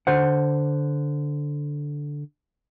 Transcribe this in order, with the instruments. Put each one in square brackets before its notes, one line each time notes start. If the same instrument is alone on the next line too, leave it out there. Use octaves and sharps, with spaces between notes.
[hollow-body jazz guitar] D3 C5 F#5